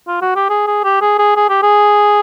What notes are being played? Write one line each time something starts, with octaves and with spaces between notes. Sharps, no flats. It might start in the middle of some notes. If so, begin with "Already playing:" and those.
F4
F#4
G4
G#4
G#4
G4
G#4
G#4
G#4
G4
G#4